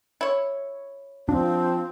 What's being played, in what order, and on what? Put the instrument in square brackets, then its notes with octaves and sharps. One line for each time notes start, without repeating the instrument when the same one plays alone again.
[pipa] E4 C#5
[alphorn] F3 [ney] C4 [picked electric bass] D4